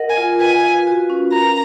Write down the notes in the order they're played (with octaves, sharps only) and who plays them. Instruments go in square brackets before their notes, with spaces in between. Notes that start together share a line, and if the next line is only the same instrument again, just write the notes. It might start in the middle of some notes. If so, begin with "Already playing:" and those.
Already playing: [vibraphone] A#4 D#5 F#5
[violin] G#5
[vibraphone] F4
[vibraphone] B4 [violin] G#5
[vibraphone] F5
F#4
C#4
[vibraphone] A#4 [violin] A#5